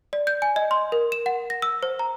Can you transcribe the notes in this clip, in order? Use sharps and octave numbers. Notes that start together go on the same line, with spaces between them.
D5
G6
G#5
D#5
C6
A#4
E7
F#5
A#6
E6
C5
A#5